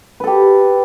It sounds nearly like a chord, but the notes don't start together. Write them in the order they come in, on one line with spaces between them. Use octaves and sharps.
B4 A4 G4